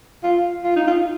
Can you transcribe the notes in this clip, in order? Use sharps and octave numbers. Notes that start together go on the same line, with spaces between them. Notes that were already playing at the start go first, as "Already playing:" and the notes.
F4
F4
D#4
F4